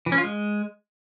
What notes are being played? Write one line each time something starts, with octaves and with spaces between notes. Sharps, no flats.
E3
C#4
F4
G#3